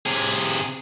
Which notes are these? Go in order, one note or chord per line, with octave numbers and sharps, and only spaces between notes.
C3 G#4